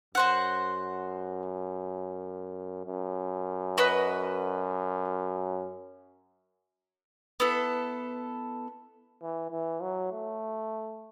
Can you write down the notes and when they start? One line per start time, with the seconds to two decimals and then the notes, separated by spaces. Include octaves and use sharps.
0.14 F#2 F#4 C5 F#5
2.86 F#2
3.78 F#4 B4 D#5
7.40 B3 E4 A4
9.22 E3
9.51 E3
9.82 F#3
10.12 A3